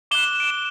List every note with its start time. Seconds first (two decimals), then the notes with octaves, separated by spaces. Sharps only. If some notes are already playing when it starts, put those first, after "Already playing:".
0.11 D6 F#6 E7 G7
0.40 D7
0.50 E7